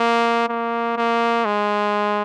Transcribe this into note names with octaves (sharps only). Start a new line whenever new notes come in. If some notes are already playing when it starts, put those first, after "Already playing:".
Already playing: A#3
A#3
A#3
G#3